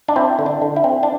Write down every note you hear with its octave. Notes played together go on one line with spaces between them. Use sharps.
D4
C4 E4
D3
D4
D3
E4
C4
D4